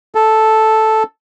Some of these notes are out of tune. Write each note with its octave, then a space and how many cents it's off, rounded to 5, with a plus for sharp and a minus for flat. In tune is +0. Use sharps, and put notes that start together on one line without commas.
A4 -5